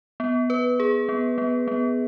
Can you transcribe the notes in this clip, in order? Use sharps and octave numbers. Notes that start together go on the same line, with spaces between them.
B3
B4
G#4
B3
B3
B3